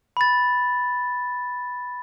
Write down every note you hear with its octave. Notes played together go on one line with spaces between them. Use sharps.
B5 A6